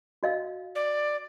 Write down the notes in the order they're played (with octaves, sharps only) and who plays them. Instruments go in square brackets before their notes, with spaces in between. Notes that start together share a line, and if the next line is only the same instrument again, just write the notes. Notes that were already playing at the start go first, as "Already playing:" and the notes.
[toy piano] F#4 D#5 F5
[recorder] D5